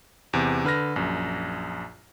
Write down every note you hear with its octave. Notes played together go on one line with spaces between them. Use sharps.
E2 C3
D3 B4 F6 A#6
A#1 F#2